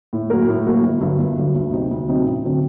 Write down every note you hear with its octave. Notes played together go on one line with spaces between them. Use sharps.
A2
F#3 A#3 F#4 A#4
A2
F#3 A#3 F#4 A#4
G1
G2 D3 F#3
G1
G2 D3 F#3
D2
C3 F#3 C4 D#4
D2
C3 F#3 C4 D#4
A1
D3 F#3 C4